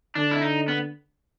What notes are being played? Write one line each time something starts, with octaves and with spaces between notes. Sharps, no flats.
D3 D4
E4
D#4
B3